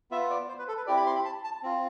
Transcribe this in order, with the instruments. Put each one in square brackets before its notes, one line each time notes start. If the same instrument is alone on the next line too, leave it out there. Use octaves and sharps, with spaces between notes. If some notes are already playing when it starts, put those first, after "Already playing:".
[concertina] B3 F4 E5
D5
C5
B4
A4
B4
C4 E4 G4 D5
B5
C6
B5
A5
A5
C4 F4